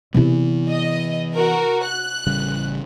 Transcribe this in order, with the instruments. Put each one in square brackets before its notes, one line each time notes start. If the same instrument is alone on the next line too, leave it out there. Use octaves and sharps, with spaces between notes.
[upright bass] C3 E4 [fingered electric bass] E3 B3
[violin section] D#5
F#4 A#4
F#6
[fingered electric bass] A1 C#3 G3